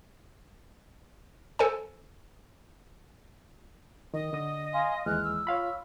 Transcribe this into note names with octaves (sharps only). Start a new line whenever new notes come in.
A4 C5 G#5
D#3 D#5
D3 D#6
F5 G#5 C6
D#2 E3 G#3 F6 F#6
E6
F4 C#5 F5 B5